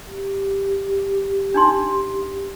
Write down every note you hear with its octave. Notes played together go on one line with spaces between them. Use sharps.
G4
D4 D#4 C6